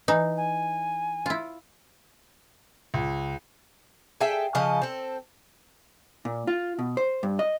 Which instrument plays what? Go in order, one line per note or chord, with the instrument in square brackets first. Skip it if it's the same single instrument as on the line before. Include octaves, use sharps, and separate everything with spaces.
[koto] E3 D#4
[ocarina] G#5
[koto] E4 F4
[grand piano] C#2
[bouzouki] G#4 A4 E5 G5
C#3 F3 A4 D#5
C4 A4
[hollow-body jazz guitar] A#2
F4
B2
C5
G2
D#5